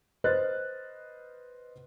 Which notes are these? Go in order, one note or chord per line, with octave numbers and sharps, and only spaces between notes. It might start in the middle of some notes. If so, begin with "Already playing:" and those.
B4 C5 D#5 F6 F#6 A6